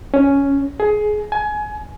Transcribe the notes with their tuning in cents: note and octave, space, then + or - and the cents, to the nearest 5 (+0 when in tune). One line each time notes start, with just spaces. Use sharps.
C#4 +5
G#4 +20
G#5 +25